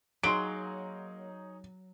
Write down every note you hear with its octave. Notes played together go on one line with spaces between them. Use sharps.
F#3 A#3 D#4 G#4 C#5 C6 D7